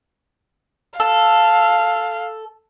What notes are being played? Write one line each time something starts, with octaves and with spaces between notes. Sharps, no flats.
A4 F5